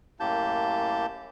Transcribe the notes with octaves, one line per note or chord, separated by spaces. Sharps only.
F#2 A2 A#3 G4 A5 G6